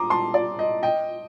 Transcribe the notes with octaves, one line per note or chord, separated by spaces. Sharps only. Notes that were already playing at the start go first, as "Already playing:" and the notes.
Already playing: A#5 C6 D6 D#6
A5 C6
D5
D#5
D#5 G5